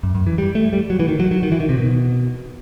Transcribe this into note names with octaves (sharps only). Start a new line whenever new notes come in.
F#2
F#2
E3
G3
A3
G3
F#3
E3
D#3
F#3
F#3
D#3
E3
D#3
C3
B2